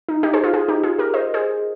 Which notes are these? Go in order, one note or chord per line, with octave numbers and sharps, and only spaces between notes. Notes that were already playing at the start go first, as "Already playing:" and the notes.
D#4
D#4 G4
G#4 C5
F4 G#4
F4 G#4
D#4 G4
F4 G#4
G4 A#4
C5 D#5
G#4 C5